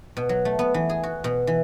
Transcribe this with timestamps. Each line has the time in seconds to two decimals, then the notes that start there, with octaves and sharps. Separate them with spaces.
0.17 B2
0.29 F#3
0.45 A3
0.59 B3
0.74 E3
0.89 G#4
1.03 F#4
1.24 B2
1.47 E3